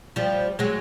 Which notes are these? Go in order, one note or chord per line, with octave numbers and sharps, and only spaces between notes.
F3 G3
F#3 G#3